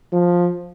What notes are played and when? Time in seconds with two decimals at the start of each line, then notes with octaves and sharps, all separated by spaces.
0.12 F3